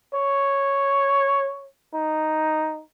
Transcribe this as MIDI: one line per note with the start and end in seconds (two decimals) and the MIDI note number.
0.14 1.66 73
1.94 2.83 63